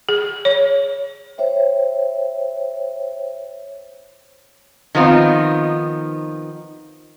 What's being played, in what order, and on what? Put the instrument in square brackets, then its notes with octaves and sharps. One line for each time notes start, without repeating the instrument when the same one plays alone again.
[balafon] G#4
C#5
[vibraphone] C5 C#5 E5 G5
[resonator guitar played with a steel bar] D#3 F3 B3 C4 D#4 F4